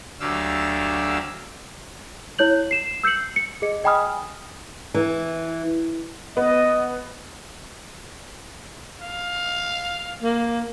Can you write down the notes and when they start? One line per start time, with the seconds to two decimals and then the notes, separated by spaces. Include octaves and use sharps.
0.20 D2 D3 F#3 G4 F5 E6
2.39 E4 C#5 G6 F#7
2.71 C7 E7
3.03 E6 G6 C7 C#7 F#7
3.36 C#7
3.62 G#4 D#5 C#7
3.84 D#5 G5 G#5 B5 D#6 F6
4.94 E3
6.37 B3 D#5
9.02 F5
10.23 A#3